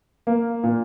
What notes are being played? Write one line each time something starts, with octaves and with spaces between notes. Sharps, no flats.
A#3
A#2